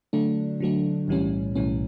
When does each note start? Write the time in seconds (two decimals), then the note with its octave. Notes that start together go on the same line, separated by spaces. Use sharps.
0.13 D3 F#3 A3 D4
0.60 D3 F#3 A3 D4
1.08 B1 A2 E3 G3 C#4
1.55 B1 A2 E3 G3 C#4